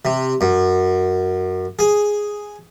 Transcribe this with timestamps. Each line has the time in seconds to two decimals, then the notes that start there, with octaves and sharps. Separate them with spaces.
0.05 C3
0.41 F#2
1.79 G#4